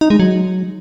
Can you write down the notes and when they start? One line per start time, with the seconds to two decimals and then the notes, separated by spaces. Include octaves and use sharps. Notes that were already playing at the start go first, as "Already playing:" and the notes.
0.01 D#4
0.10 G#3
0.20 F#3